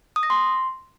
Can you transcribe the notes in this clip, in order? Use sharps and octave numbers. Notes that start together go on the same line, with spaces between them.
D#6
A#6
C6